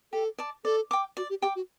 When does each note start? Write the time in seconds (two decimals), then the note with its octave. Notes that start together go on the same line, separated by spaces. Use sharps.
0.13 G4 A4
0.39 D5 A5 D6
0.65 A4 D5
0.91 G5 D6
1.17 F#4 D5
1.30 G4
1.42 G4 G5 D6
1.56 F#4